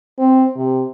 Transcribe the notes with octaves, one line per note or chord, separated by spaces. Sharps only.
C4
C3